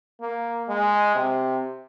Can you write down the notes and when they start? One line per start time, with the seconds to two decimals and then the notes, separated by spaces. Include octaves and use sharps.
0.21 A#3
0.69 G#3
1.15 C3